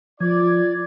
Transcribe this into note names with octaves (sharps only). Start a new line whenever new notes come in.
F3 F4 D5 G#6